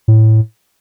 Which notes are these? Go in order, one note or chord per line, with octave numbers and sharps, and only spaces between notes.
A2